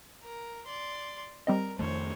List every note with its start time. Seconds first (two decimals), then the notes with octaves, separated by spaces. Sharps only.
0.23 A#4
0.66 D5 C6
1.47 G3 C4 A#4 D#5
1.79 F2 D#3 A3 C5 C#5